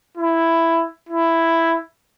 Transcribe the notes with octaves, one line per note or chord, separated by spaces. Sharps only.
E4
E4